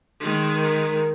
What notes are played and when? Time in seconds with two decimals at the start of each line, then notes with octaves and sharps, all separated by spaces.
0.20 D#3 G#3
0.56 A#4